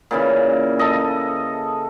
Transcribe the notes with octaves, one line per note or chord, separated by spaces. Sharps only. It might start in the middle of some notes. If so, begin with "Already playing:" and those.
A#2 C#3 E3
A4 D#5